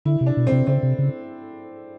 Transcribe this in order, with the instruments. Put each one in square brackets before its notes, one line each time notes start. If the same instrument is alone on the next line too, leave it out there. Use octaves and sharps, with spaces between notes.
[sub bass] D3 [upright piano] E4
[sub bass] C3
[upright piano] D4
[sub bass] B2
[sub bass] C3 [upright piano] C4
[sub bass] C#3 [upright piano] C4
[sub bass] C3
C#3